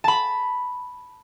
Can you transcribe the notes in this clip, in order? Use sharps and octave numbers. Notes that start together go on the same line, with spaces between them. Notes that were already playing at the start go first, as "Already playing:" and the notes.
A5 B5